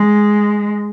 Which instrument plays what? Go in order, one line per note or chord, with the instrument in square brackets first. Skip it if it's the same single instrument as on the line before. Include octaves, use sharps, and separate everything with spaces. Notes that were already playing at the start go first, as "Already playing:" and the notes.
Already playing: [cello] G#3